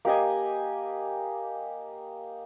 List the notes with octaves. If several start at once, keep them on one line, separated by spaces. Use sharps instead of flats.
A#3 G4 D#5 G#5